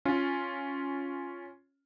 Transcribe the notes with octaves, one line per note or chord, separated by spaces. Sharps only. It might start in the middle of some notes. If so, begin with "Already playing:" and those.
C#4 F4